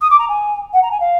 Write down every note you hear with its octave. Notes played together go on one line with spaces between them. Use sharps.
D#6
D6
A#5
G#5
F#5
A#5
G#5
F5